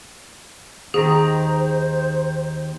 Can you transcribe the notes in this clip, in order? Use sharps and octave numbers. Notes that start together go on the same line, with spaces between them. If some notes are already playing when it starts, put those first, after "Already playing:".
D#2 D#3 G#4 C5 A#5